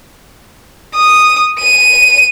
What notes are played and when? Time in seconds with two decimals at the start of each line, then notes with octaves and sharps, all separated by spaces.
0.96 D#6
1.59 D#7